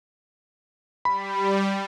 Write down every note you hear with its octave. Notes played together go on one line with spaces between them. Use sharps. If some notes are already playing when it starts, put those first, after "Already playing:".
G3 B5